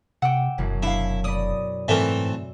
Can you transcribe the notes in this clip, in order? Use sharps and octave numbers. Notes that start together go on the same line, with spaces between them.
C3 F#5 G5 D6 E6
F1 F#2 B2 E3
D4 E4 F5
D5 D#5 B5 D#6
G#2 E3 A3 C4 A#4 B4 E5